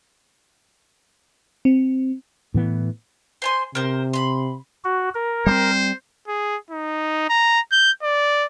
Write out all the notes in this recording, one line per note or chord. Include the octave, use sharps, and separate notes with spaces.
C4
A2 E3 B3
C5 G#5 C6
C3 A#4 C5
B5 C6
F#4
A#4
G3 A3 C4 C5
G#4
D#4
A#5
G6
D5